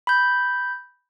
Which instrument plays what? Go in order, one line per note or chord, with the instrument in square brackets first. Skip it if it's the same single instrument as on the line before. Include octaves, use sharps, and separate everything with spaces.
[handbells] B5 G6